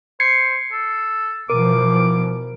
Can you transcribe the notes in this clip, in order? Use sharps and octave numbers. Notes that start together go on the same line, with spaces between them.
C5 G#6 C7 C#7
A4
B2 E3 F3 A#4 D6